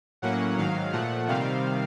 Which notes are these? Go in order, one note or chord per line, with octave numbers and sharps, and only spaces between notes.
A2 F#3 A#3 C#4 F#5
G#2 D#3 F#3 F5
A#2 F3 A3 F#5
C3 D#3 G3 C4 F5